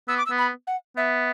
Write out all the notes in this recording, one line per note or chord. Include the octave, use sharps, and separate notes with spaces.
B3 E6
D6
E6
B3
B5
F#5
B3 E5